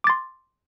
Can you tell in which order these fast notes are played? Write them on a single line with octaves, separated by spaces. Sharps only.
D6 A6 C6